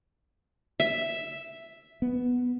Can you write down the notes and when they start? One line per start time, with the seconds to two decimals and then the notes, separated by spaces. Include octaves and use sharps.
0.80 E5
2.02 B3